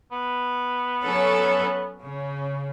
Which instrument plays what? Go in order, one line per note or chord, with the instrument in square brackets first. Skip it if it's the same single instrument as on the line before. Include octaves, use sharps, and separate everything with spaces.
[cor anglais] B3
[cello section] F#3 C#4 A4
C#3